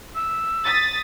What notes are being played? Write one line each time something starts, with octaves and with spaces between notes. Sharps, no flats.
E6
D#6 A6 B6